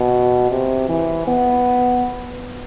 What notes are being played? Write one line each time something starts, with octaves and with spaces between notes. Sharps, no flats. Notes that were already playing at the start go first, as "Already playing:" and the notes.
Already playing: B2
C3
E3
B3